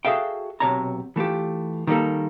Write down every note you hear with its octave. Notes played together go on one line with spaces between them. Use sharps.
F#4 G#4 A4 E5 F5 G5
B1 C3 C#5 A5 A#5
E3 A3 F4 G4
D#3 G3 A#3 A4